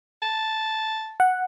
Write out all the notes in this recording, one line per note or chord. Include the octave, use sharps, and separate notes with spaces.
A5
F#5